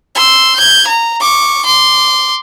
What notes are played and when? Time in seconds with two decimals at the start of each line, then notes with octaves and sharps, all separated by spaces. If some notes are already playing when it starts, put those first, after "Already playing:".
0.15 C6 E6
0.56 G6 G#6
0.87 A#5
1.20 C#6 D6
1.65 C6 D6